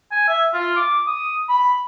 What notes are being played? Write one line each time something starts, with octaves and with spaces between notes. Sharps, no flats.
G#5
E5
F4
D6
D#6
B5